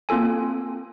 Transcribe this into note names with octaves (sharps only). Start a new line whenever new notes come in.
A#3 C4 F4 A4 G#5